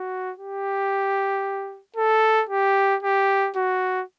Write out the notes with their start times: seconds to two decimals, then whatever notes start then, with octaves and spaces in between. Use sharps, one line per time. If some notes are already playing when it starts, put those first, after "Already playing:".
Already playing: F#4
0.38 G4
1.96 A4
2.49 G4
3.03 G4
3.56 F#4